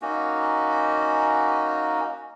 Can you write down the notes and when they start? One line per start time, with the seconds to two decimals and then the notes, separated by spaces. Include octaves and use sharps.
0.02 A#3 C#4 D#4 F#4